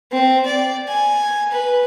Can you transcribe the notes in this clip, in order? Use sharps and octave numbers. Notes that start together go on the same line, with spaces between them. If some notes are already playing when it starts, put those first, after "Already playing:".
C4
D5
G#5
B4